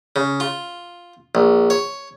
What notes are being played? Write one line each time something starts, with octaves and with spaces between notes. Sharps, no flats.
C#3
F4
A#1
C#5